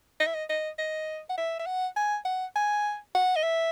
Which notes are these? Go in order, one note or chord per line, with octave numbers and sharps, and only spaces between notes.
D#5
E5
D#5
D#5
D#5
F#5
E5
E5
F#5
G#5
F#5
G#5
F#5
D#5
E5